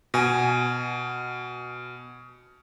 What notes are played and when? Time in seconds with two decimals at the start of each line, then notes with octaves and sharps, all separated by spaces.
0.14 B2 G#5